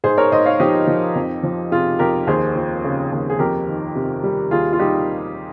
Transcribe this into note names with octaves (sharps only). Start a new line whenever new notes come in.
G#2 G#4 C5
A#4 C#5
G#2 C5 D#5
C#5 F5
F3 D#4 G4
F3
F2
F3
C3 F4 G#4
F2 G4 A#4
D#2 G#4 C5
F3
C#3
D#2
G#4
F2 G4 A#4
D#3
C3
G3
D#2 F4 G#4
F4
G3 D#4 G4